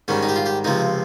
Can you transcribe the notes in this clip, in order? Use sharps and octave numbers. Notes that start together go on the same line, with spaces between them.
G#2 D#3 G3 C#4
D#4
G4
F4
G4
C#2 C3 F3 D#4